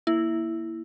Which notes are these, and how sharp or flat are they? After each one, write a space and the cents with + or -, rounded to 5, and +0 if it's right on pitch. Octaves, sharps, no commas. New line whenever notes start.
A#3 +0 E4 +0